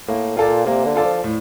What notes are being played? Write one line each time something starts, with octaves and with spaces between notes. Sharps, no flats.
A2 A#3
A#2 F4 A4 D5
C3 A#3
D3
F4 A4 D5
F3
A2